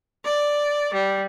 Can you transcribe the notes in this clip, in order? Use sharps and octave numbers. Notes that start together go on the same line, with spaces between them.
D5
G3